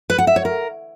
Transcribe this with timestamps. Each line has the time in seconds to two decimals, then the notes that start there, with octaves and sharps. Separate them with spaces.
0.10 B4
0.18 F#5
0.27 E5
0.36 C#5
0.45 A#4